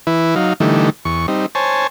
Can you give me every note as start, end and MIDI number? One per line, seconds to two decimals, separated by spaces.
0.07 0.35 52
0.07 0.35 64
0.07 0.35 71
0.36 0.53 54
0.36 0.53 63
0.36 0.53 77
0.60 0.90 50
0.60 0.90 52
0.60 0.90 55
0.60 0.90 57
0.60 0.90 63
1.05 1.26 40
1.05 1.26 85
1.28 1.46 55
1.28 1.46 60
1.28 1.46 63
1.55 1.87 72
1.55 1.87 73
1.55 1.87 80
1.55 1.87 81